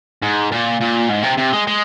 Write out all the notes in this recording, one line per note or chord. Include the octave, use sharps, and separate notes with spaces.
G#2
A#2
A#2
G#2
C3
C3
G#3
G#3